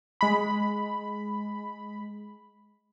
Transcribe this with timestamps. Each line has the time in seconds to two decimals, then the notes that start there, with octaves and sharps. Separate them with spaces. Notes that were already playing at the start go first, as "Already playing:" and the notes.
0.21 G#3 B5